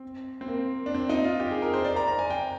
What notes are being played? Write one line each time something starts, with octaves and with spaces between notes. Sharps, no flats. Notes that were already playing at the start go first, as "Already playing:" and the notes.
Already playing: C4
C4
A#3
D4
C4
D#4
F4
G4
G#4
A#4
C5
D5
A#5
A#5
G#5
G5